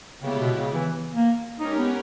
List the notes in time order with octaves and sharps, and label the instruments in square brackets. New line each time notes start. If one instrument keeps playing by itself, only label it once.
[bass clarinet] C#3 [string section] G#3 B3 E4 G4 C#5
[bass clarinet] B2
C#3
E3
A#3
[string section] G#3 C#4 G4 A#4 C#5 [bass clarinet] D#4
[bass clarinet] B3